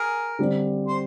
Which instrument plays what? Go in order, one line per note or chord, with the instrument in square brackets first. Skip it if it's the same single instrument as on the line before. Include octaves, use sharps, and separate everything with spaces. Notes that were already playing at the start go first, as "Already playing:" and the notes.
Already playing: [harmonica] G#4 A#4
[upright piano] D3 G3 C4
[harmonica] C5